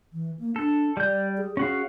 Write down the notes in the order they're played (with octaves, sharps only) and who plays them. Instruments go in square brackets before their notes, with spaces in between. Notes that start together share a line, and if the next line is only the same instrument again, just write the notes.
[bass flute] E3
A#3
[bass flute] D4 [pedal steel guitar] A4
[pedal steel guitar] G3 G6 [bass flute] D5
[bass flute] G#4
[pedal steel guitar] C#4 F#4 F5 [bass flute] G#4